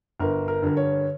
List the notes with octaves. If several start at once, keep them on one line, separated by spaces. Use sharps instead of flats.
G1 A#4
A#4
G2 D3 A#4
C#5